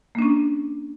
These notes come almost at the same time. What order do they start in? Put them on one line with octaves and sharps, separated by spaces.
A#3 D4 C#4